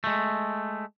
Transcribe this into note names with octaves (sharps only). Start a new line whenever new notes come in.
G#3 A3